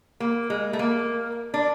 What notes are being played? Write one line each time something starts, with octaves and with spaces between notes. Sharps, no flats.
A#3
G#3
A3
A#3
D4